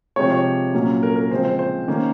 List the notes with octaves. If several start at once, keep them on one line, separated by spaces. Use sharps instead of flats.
C3 F3 G#3 C4 C#5
C#5
A#2 F#3 A#3 C#4
A#4
A#4
C#3 F3 G#3 C4 C5
C5
C5
D#3 A#3 C#4